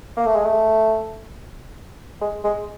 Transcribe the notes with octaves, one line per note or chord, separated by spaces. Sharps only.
A#3
A3
G#3
A3
G#3
G#3